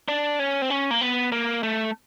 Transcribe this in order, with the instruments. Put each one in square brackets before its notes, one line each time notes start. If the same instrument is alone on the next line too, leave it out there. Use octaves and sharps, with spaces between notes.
[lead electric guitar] D4
C#4
C4
C#4
A#3
B3
A#3
A3